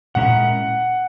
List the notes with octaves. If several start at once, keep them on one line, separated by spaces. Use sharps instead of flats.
A#2 G#3 C#4 E4 A#4 F#5